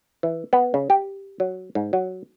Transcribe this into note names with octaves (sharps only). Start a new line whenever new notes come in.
E3
B3
C#3
G4
F#3
G#2
F#3